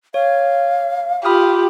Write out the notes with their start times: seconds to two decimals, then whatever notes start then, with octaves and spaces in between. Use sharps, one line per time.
0.14 C#5 F5
1.25 F4 G4 B5 D#6 F6